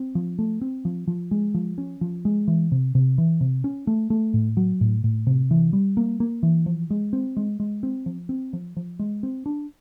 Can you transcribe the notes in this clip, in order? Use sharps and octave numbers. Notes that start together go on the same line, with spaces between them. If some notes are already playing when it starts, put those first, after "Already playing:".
Already playing: C4
F3
A3
C4
F3
F3
G#3
F3
C#4
F3
G#3
E3
C3
C3
E3
C3
C#4
A3
A3
A2
F#3
A2
A2
C3
E3
G3
A#3
A#3
E3
F3
G#3
C4
G#3
G#3
C4
F3
C4
F3
F3
G#3
C4
D4